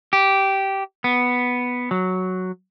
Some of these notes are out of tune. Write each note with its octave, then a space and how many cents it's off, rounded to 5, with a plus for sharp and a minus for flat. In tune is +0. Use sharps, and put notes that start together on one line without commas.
G4 -10
B3 +0
F#3 +0